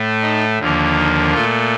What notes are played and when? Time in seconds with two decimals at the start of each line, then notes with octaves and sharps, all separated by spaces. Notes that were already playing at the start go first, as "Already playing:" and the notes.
Already playing: A2 A3
0.22 D#4
0.60 D#2 D3 F3 A#3
0.97 D#4
1.33 A#2 A3 F4